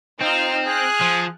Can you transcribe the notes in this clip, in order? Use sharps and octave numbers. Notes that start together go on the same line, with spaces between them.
C4 D#4 F4 F6
G#4 F6 F#6
F3